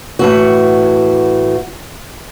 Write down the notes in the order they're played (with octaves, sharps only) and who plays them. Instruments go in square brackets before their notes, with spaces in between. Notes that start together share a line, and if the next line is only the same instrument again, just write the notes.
[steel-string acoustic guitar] A2 E3 F#4